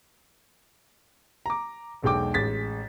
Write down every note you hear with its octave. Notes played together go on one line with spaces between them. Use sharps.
A#5 D6
E1 B1 G#3 A4 G5 D6
A1 G#3 A6 B6